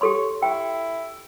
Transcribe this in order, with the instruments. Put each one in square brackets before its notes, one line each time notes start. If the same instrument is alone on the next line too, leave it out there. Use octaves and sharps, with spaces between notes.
[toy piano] G4 A4 C6 [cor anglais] C#5
[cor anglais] E4 [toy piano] G5